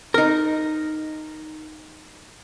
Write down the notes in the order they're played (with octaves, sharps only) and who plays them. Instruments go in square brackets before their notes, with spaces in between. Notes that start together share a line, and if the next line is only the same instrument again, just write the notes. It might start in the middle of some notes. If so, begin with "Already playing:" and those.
[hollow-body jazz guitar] D#4 A#4